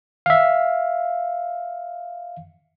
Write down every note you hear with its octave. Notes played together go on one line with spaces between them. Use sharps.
E5 F5